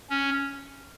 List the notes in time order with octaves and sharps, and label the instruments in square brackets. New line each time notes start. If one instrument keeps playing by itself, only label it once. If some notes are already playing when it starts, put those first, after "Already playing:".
[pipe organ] C#4